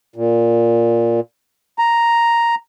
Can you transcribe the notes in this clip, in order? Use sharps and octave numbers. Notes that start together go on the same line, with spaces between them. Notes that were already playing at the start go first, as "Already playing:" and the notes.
A#2
A#5